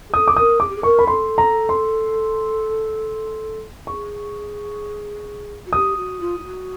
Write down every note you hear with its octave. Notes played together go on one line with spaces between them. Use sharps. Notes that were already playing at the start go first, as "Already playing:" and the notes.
G#4
A4 D#6
D6
A4
A#4 D#6
G#4 D6
G4
G#4
A#4 C#6
B5
A4 C6
A#5
C6
G#4 C#6
F#4
G4 D#6
F#4
F4
F4
F#4